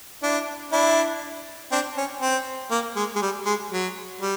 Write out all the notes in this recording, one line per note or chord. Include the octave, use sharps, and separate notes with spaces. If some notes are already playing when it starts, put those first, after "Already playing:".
D4 E4
D4 E4
C4 D4
C#4
C4
A#3
G#3
G#3
G3
G#3
F#3
G3